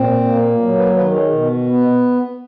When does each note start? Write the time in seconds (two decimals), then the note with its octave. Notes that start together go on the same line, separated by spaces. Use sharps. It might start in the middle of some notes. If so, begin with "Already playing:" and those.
Already playing: A#2 C4
0.25 A#3
0.61 F#3
0.78 B4
0.96 D#3 B4
1.14 G#4
1.32 B2
1.67 B3